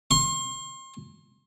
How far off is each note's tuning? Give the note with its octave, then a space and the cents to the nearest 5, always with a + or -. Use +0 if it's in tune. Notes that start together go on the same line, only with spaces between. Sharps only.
C6 +35